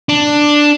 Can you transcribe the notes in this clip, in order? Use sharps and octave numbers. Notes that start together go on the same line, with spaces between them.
D4